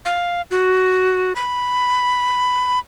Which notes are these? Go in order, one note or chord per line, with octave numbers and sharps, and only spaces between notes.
F5
F#4
B5